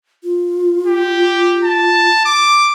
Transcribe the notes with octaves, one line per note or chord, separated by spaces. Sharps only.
F4
G4
A5
D6